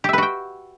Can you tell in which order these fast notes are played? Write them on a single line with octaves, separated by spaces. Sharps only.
G4 E5 B4 F#4 G5